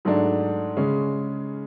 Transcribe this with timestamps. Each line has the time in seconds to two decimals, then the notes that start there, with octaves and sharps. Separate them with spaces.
0.05 G#2 F#3 A3 D4
0.77 C#3 G#3 C#4